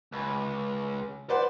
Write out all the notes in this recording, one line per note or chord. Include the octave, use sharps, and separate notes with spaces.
C#2
B4 C5 D5 F#5